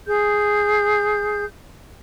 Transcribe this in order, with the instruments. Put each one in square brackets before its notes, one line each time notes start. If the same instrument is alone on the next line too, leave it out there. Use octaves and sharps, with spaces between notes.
[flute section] G#4 G6